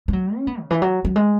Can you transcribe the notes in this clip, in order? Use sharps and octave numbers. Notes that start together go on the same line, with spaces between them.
G#3
F#3
C#4
B3
C#3
E3
F#3
F#3
G#3